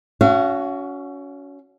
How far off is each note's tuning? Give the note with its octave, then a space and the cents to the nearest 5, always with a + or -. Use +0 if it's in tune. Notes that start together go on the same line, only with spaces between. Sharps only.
C#4 +25 F#4 -5 F5 -45